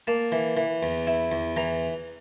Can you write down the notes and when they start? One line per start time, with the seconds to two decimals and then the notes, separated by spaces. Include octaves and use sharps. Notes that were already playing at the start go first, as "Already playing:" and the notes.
0.07 A#3 A5
0.32 E3
0.57 E3
0.83 E2
1.07 E4
1.32 E2
1.57 E3 A#5